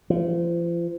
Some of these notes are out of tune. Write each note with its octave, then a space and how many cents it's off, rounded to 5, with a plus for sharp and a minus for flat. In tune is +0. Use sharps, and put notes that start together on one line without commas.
F3 -40